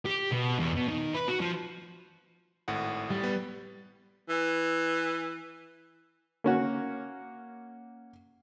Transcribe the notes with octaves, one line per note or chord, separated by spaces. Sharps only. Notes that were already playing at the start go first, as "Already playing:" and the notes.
G4
B2
E2
B2
D#3
B4
F#4
F3
G#1 A2 F#5
G3
B3
E3
A#3 C#4 F#4